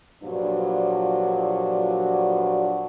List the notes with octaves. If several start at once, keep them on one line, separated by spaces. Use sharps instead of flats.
G2 A#2 F3 F#3 D4 F#4